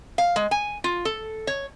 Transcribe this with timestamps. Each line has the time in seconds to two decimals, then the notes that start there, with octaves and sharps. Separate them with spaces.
0.18 F5
0.36 G#3
0.51 G#5
0.84 F4
1.05 A4
1.47 C#5